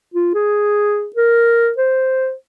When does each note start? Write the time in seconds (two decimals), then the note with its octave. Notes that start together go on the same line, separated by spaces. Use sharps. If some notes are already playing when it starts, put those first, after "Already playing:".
0.14 F4
0.34 G#4
1.16 A#4
1.78 C5